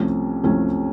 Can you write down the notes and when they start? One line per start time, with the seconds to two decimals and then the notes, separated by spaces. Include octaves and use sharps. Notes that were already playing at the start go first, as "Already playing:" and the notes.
Already playing: C2 C3 F3 A3 C#4
0.43 C2 C3 F3 A3 C#4